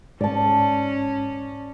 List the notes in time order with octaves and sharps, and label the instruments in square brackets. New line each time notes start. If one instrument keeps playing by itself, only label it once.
[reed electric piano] G#2 [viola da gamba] C#4 [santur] D5 A5